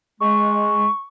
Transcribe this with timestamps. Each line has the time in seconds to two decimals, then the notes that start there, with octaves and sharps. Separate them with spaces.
0.20 G#3 C#6